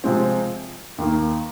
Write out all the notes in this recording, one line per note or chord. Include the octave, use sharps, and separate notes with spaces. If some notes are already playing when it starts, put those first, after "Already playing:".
C3 F3 G#3 C4
D#2 D#3 A#3